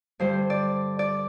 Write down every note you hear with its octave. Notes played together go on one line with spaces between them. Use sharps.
G2 D3 G3 C5
D5
D5